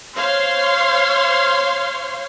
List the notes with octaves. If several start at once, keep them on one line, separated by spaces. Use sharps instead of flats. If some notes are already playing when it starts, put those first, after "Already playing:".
C5 C#5 F5 C6